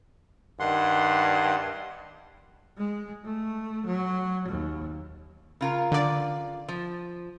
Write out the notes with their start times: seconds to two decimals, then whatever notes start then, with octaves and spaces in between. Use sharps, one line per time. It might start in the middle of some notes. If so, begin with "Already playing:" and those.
0.60 G2 D#3 F#5 C6
2.78 G#3
3.25 A3
3.86 F#3
4.49 D#2
5.61 C#3 F4 A#4
5.92 D3 D5
6.68 F3